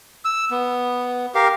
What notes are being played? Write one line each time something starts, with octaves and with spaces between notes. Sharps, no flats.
E6
B3
G4 A#4 F5